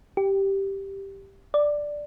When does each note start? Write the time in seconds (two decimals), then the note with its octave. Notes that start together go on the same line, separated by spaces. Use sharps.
0.17 G4
1.54 D5